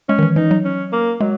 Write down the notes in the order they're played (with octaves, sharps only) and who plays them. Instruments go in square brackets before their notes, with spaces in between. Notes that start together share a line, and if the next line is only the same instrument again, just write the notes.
[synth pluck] G#3 [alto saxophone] C#4
[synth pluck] D#3
E3
[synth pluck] E3 [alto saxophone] D#4
[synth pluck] F#3
[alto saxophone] C#4
A#3
[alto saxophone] F#3 [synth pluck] G#3